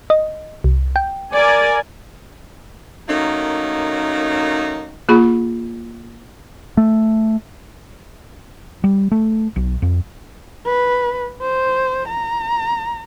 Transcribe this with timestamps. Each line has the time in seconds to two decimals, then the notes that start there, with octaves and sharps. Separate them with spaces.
0.10 D#5
0.64 C2
0.96 G5
1.33 A#4 D5 G#5
3.09 D#3 F#3 A3 A#3 C#4 D#4
5.09 A#3 F4 G#4 B5
6.77 A3
8.84 G3
9.12 A3
9.56 B1
9.82 F2
10.66 B4
11.42 C5
12.08 A#5